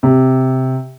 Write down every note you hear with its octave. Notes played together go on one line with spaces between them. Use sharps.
C3